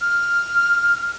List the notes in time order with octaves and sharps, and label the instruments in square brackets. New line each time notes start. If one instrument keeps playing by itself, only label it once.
[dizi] F6